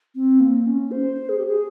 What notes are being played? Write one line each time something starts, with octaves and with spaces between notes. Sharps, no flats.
C4
A#3
C#4
C5
G#4
G4
G#4